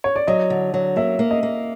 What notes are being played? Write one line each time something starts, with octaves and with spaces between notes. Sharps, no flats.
C#5
D5
F#3 D#5
D3
F#3
A#3 E5
A#3
D#5
A#3